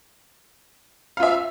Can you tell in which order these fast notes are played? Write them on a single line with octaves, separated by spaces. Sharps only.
F5 F4 E5